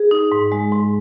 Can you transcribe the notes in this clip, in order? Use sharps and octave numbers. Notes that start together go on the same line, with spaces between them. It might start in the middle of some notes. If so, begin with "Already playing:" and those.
Already playing: G#4
D#4
G#2
G#3
G#2